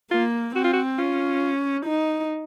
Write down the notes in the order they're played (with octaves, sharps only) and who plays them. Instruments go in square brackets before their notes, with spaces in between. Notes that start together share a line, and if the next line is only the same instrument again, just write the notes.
[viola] A#3 [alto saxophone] F4
[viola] C4 [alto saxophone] F#4
[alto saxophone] F4
F#4
[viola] C#4 [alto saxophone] F4
[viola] D#4